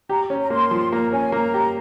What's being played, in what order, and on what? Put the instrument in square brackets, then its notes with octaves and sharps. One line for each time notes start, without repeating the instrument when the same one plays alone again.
[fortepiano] G4 [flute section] A#5
[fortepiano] C#4
[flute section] A#5
[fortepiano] A#3 [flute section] C6
[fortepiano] F3
[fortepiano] A#3 [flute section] A#5
[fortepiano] C#4 [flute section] G#5
[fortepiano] A#3 [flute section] A#5
[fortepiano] G4